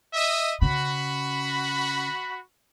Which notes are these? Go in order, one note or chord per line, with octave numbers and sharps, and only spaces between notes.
D#5 E5
C#3 F#4 B5